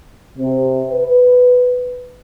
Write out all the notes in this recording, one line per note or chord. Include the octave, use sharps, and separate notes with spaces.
C3
B4